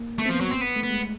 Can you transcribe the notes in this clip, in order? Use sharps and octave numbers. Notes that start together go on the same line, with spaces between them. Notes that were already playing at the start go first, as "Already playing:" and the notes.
Already playing: A#3
A3 B3
C4
F3
B3
F#3
C4
B3
A3
B3
G#3